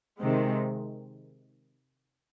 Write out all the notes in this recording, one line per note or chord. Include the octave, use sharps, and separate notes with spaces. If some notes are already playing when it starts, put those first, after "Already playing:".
C3 D#3 G#3 C4